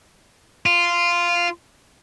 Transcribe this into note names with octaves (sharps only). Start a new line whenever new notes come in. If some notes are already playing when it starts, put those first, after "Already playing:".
F4